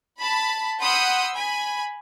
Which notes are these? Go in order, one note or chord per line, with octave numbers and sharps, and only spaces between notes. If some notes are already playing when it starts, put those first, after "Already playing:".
A5 B5
F#5 B5 C6 D#6 E6 G6
G#5 B5